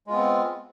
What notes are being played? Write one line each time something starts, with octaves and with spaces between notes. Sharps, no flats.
G#3 B3 C4 F4